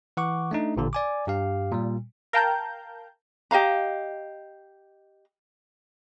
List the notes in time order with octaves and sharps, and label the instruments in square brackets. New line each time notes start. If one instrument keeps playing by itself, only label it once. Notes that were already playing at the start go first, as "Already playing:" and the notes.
[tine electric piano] E3 F#5 C#6 D6
A3 D4 D#4
A1 A#2 D3
D5 G#5 D6
G2 G4 F5
A#2 G3
[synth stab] A#4 F5 G5 A5 A#5 G6
[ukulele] G4 D#5 F5 A#5